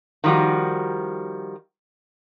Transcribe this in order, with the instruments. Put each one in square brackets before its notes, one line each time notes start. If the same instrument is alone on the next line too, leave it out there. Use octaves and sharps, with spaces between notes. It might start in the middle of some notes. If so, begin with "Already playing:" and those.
[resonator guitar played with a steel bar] D#3 F3 G3 D#4 F#4